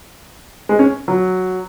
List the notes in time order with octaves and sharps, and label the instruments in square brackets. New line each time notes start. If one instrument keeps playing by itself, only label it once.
[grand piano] G#3
C#4
F#3